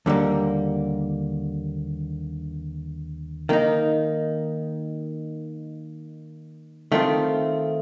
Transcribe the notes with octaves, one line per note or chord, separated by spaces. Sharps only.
D#2 D3 G3 A#3
D#3 A#3 D#4
D#3 A3 C4 F4